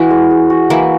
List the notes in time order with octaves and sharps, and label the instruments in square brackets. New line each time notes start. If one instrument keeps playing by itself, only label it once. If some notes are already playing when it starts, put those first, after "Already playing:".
Already playing: [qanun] E3 E4 [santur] F#4
[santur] G#3
G#3
F#4
[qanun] E3 E4 [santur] A#3